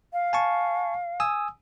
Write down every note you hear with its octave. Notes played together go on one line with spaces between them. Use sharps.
F5
G#5 A5 C#6
G#5 D#6 E6